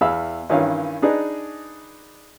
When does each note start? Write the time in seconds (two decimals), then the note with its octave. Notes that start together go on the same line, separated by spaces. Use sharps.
0.01 E2 G#4 E5 F5 B5 E6
0.50 G2 D#3 E3 C#4 F5
1.02 D4 D#4 G#4 B4 D5 D#5